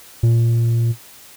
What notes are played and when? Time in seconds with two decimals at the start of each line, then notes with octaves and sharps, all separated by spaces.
0.23 A#2